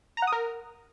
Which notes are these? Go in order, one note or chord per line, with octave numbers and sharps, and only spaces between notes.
A#5
F#5
D#6
A#4